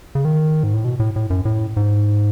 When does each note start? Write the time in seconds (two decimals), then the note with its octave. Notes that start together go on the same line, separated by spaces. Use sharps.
0.15 C#3
0.25 D#3
0.63 G#2
0.74 A2
0.84 B2
1.00 A2
1.16 A2
1.30 F#2
1.45 A2
1.77 G#2